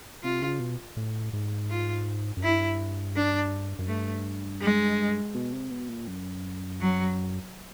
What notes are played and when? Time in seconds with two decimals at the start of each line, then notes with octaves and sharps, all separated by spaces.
0.23 C3 F4
0.42 C#3
0.60 B2
0.97 A2
1.33 G#2
1.70 F4
2.37 F#2
2.42 G2 E4
3.16 D4
3.79 F#2
3.88 G2 A3
4.62 G#3
5.35 B2
5.53 C3
5.71 B2
5.89 A#2
6.08 F#2
6.81 F#3